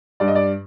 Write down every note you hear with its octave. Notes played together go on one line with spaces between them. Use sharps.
G2 D5
D#5
D5